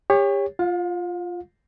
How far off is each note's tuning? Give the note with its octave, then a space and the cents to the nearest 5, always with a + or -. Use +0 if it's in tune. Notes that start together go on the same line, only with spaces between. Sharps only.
G4 +35 C#5 +0
F4 +0 F5 +40